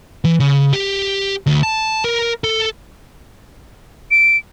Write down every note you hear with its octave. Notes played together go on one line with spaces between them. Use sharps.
E3
C#3
G4
D2
A5
A#4
A4
D7